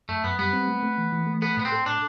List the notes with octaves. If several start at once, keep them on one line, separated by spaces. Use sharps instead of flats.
F#2 A3
F#2 B3
G3 B3
C4
A3
A3
E3
E3
A3
B3 A4
A2 B3
C4
A4
A2 D4